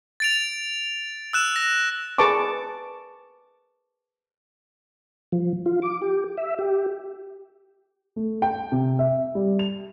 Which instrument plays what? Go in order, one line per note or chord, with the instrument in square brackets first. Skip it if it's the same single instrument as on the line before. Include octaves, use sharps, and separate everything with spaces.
[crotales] A6 D7 F7
E6 F#6 E7
A#6
[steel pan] G#4 A#4 B4 A5 C#6 D6
[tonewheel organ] F3
F4
D6
G4
E5
G4
[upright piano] A3
G5
C3
E5
G3
F7